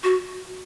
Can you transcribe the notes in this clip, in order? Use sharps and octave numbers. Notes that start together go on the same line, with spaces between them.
F#4